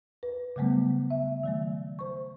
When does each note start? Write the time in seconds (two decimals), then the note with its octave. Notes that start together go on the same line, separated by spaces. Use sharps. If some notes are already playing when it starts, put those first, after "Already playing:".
0.23 B4
0.56 C#3 F#3 G3 A3 B3
1.11 E5
1.43 D#3 F#3 A3
1.99 C5 C#6